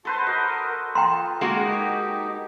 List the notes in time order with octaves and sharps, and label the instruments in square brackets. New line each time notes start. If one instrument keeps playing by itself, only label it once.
[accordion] F#4 A5 C6 [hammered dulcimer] A4 B4 C5
[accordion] F#4 A#4 [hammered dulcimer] D#5
[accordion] F4 [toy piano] G5 A#5 C6
[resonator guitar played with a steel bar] G#3 A#3 F#4
[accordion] D#4 G4